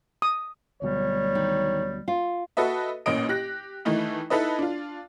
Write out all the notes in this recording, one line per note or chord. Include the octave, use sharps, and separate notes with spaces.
D#6
D2 B2 F#3 G3 C#5
D#3
F4
F#4 A4 B4 D#5 E5
A1 A#2 C#4 D#5 D7
G4 F#6 A#6
D#3 E3 A3 D#4 E4
D#4 E4 A4 B4 D#5
D4 F4